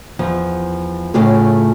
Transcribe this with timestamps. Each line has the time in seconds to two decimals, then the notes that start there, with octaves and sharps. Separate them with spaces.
0.19 E2 F3
1.14 A2 C#3 A3 F4 G#4